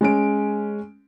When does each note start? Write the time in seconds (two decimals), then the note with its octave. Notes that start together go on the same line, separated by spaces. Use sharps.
0.01 G#3 C#4 D7